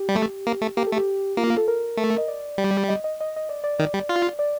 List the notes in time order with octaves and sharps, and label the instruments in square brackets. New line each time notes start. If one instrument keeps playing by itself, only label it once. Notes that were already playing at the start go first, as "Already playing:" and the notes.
Already playing: [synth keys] G4
[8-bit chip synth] G3
A3
A#3
A3
[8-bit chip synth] A#3 [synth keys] G4
[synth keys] A4
[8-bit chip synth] A3
[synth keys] G4
[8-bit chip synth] A#3 [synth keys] F4
[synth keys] F4
A4
A#4
[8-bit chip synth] A3
[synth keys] D#5
D5
[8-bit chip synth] G3
[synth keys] D#5
D#5
D#5
D#5
D5
D5
[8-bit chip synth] D#3 [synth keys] D5
[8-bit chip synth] G3
F4
[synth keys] D5